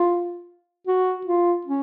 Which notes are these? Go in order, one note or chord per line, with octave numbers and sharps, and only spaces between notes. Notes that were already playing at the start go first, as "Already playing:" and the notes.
Already playing: F4
F#4
F4
C#4